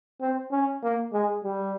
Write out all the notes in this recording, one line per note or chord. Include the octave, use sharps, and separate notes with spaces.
C4
C#4
A#3
G#3
G3